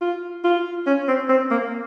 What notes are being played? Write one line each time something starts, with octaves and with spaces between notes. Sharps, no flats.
F4
F4
C#4
C4
C4
A#3